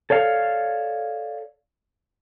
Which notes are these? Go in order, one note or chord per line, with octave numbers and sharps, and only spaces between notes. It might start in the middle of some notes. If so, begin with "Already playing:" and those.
A4 C#5 D5 F5